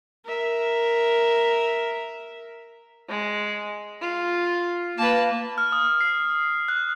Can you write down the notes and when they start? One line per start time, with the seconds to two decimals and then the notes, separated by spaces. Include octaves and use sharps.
0.25 A#4 E5
3.09 G#3
4.01 F4
4.98 A#3 B4 A5
5.58 F6
5.72 D#6
6.01 C7
6.68 F#6